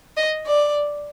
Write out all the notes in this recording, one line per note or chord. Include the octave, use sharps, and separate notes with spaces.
D#5
D5